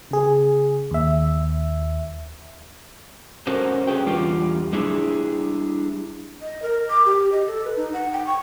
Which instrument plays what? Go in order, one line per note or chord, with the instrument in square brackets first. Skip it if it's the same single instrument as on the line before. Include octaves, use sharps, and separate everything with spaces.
[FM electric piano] C#3 G#4
D#2 E5
[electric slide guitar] C#4 F#4 A4 A#4 C5
C#4 G#4 B4 G5
E2 D3 G3 F4 G4
G3 D4 E4 G#4
[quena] D#5
A#4
D6
G4
D#5
A4
B4
D#4
F#5
G5
C#6